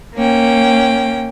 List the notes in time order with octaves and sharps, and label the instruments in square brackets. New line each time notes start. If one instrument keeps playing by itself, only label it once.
[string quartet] A#3 C#4 G5